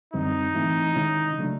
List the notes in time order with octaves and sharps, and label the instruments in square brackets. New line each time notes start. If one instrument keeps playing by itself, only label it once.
[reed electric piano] F#2 D3 G3 C4 [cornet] D#4
[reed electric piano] G#2 E3 A3 C4 E4
C3 D#3 G#3 C#4 E4
C#3 F#3 A3 D4